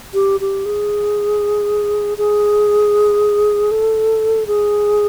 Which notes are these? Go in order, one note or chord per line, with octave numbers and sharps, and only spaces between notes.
G4
G4
G#4
G#4
A4
G#4